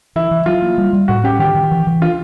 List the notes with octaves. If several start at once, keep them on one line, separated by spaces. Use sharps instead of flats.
E3 E4
E3
F#3 F4
A#3
G3
G3
A2 F#4
C#4 G4
D#3 G4
D#3
E3
E3
D4 F4